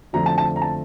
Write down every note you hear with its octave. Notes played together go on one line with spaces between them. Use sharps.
F2 D3 F3 A3 C4 A#5
A5
A5
A#5
A5